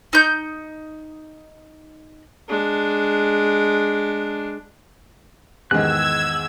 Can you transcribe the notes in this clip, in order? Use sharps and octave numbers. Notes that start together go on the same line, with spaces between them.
D#4 G6
G#3 D4
E2 G#2 D#3 E6 F#6 G#6